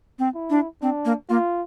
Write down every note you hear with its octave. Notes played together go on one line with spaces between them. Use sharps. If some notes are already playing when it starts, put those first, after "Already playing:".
C4
E4
D4
C4 D4
A#3
A#3 F4